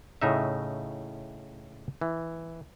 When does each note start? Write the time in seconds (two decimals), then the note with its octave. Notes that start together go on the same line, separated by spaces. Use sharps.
0.21 A2 C#3 D#4 E5
2.01 E3